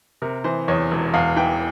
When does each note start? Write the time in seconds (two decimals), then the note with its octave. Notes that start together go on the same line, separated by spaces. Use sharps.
0.22 C3 A#4
0.44 E3 C5
0.68 E2 C#5
0.91 E1
1.13 E2 F5
1.36 E3 G5